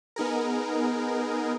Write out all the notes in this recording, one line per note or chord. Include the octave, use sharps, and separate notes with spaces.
B3 D#4 G#4 A#4